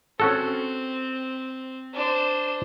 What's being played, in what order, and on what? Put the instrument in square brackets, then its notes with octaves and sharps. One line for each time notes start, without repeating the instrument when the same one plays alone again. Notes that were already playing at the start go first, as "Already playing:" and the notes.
[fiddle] C4 [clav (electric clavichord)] C#4 F#4 A4
[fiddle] D4 C5